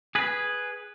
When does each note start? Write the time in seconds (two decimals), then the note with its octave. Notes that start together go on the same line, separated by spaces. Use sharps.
0.15 G#4 B4